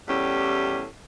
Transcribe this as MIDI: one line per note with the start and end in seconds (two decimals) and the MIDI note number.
0.08 0.84 40
0.08 0.84 45
0.08 0.84 55
0.08 0.84 61
0.08 0.84 67